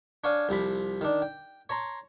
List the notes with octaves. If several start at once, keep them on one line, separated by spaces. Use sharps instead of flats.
D4 C#5 F5 G#5
C2 C3 F3 B5
D#3 D4
G5
C#5 A5 A#5 C6